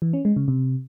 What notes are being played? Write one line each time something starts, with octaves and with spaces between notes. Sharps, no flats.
E3
C#4
G#3
C#3
C3